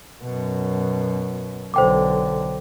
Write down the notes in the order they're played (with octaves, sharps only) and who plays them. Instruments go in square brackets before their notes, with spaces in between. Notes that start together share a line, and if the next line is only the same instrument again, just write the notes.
[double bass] F#2 B2
[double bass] B1 D3 [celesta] C5 G5 D6